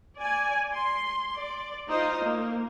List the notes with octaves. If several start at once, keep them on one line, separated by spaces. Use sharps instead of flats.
D5 G#5
C6
D5
D#4 F4 C5 D#5
A#3